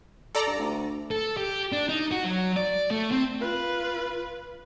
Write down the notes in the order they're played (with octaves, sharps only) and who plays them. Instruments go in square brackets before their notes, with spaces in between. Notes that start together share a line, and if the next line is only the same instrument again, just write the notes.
[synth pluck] A4 D5 A#5
[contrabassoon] G2
D2
[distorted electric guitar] A4
G4
D4
D#4
F#4
F#3
D5
A3
C4
[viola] F4 B4